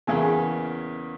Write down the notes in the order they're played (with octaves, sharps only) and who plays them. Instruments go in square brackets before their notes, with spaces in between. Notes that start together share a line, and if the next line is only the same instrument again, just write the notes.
[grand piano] E2 C#3 E3 A#3 C#4 [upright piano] G#4 G#5
[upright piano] G#4 G#5